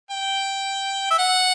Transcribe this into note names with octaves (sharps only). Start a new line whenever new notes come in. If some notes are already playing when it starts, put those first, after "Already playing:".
G5
E5
F#5